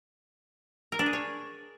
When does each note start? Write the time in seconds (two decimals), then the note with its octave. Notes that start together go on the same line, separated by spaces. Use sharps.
0.92 A#4
0.99 D4
1.06 G#4
1.13 C#5